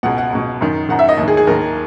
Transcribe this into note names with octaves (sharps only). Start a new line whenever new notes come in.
C#2 B2 F#5
F#5
C#2 B2
F#2 D#3
F#2 D#3 F#5
E5
D#5
D#2
D#3 G#4
G#4
D#2 D#3 A#4